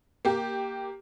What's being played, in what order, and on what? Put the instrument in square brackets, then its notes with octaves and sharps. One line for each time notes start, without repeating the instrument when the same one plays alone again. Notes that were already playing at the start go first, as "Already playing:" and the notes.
[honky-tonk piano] A#3 G4